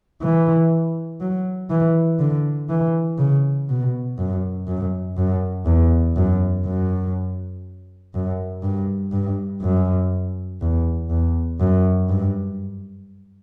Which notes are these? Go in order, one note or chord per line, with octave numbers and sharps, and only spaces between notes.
E3
F#3
E3
D3
E3
C#3
B2
F#2
F#2
F#2
E2
F#2
F#2
F#2
G2
G2
F#2
E2
E2
F#2
G2